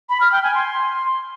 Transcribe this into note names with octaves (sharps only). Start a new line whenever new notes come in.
B5
F6
G5
G#5
C6